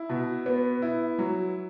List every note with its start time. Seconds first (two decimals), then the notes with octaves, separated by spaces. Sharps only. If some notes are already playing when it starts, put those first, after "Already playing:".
Already playing: E4
0.09 B2
0.46 B3
0.82 E4
1.18 F#3